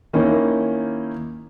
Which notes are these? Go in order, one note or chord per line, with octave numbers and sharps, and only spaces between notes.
D#3 A#3 C#4 D#4 E4